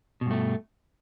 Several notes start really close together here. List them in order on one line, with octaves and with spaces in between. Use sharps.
B2 G2 A3